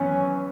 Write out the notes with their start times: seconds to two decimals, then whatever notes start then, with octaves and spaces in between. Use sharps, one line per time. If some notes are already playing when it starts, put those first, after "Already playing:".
Already playing: F#2 E3 B3 C#4